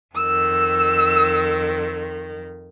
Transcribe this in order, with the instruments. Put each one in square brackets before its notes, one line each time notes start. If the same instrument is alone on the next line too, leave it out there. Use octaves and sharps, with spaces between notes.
[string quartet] F2 D#3 [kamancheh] E6